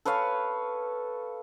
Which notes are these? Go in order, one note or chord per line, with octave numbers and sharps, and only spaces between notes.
A4 B4 C#5 F5